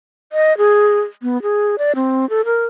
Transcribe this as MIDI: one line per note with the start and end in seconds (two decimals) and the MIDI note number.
0.33 0.57 75
0.58 1.01 68
1.22 1.41 59
1.42 1.76 68
1.78 1.92 74
1.95 2.28 60
2.30 2.41 69
2.45 2.65 70